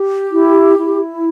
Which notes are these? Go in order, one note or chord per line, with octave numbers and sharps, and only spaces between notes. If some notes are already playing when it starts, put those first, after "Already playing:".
Already playing: G4
E4
E4